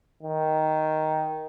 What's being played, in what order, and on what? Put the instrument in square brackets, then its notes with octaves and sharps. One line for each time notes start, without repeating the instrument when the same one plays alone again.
[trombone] D#3